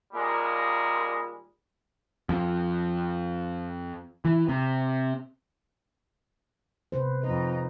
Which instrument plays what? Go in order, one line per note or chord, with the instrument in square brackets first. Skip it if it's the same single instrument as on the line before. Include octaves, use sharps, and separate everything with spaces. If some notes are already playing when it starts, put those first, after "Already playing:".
[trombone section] D#2 A#2 G3 G#3
[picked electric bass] F2
E3
C3
[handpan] C3 B4 C5
[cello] F2 D#4 [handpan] B4